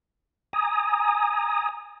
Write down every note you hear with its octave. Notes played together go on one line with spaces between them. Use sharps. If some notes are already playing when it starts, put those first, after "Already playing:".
G#5 A#5 D#6